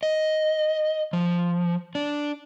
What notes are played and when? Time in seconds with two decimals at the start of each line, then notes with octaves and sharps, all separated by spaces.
0.03 D#5
1.13 F3
1.95 D4